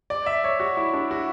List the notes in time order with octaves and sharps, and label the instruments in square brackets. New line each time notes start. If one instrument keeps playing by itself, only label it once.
[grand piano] D5
E5
C#5
F#4
E4
D4
F#4